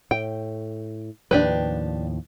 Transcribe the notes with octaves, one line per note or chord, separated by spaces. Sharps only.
A2 G5
D#2 A2 F3 D4 G4 B4